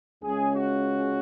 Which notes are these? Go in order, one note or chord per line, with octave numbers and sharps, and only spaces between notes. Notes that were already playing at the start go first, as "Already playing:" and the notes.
C#2 C#3 G#3 C#4 G#4
F#4